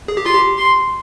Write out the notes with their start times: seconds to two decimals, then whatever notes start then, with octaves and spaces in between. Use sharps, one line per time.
0.08 G#4
0.17 G4
0.25 F4 C6
0.34 G4
0.57 C6